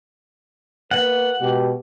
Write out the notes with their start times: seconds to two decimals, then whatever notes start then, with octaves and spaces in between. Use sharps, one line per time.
0.91 A#3 B4 F#5
1.39 B2 G#3 G4